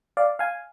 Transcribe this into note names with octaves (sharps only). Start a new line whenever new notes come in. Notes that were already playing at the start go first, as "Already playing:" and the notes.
D5 F5
F5 G#5